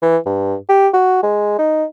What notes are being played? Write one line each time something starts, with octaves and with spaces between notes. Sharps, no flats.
E3
G2
G4
F#4
G#3
D#4